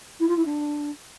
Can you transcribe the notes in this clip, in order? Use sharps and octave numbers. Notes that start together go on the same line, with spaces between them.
E4
F4
E4
D4